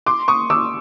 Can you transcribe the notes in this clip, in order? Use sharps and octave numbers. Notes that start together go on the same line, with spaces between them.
C6 D6
C#6 D#6
D6 E6